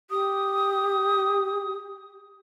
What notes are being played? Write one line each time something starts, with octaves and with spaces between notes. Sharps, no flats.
G4 D#6